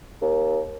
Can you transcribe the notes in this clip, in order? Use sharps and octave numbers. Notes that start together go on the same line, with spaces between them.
D#2